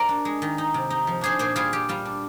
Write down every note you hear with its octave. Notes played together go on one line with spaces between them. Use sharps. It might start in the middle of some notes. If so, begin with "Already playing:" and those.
Already playing: A#4 D5
D4
G#3
D#3
D#4
C3
D#4
F3
D4 G#4 C5
A#2 G#4 C5
G3 F4 G#4
G3 G4
G3 F4
D4